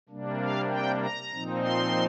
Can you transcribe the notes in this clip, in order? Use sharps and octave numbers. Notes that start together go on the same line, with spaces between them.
C3 G3 A#3 D4
F5
G5
A#5
A#2 F3 C4 D#4
C6